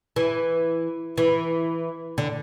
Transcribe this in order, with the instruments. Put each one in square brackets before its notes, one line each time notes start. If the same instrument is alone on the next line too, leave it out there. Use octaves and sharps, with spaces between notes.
[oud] E3
E3
D3